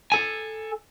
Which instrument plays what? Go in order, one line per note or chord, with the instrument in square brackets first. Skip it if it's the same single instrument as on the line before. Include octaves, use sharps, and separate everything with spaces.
[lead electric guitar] A4 G#5